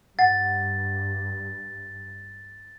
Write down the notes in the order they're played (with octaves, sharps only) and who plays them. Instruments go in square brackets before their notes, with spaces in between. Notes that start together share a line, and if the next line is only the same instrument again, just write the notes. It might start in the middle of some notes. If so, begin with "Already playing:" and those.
[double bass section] G2 [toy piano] F#5 [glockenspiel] A6